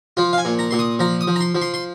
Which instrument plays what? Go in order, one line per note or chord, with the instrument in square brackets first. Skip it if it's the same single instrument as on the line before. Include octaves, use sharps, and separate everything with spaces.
[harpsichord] F3 F4
F5
G#5
A#2
A#5
A#2 C6
D#6
F3 A#5
D#6
F3
A#5
C6
F3
C6
C6